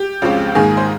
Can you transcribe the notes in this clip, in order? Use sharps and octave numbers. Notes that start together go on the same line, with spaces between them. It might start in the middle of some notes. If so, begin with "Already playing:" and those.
Already playing: G4
C#2 C#3 F3 C4
G#2 D#3 A#3 G#4
C5